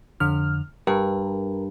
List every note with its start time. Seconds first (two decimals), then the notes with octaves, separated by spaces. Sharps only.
0.20 F2 D3 F6
0.87 G2 A#4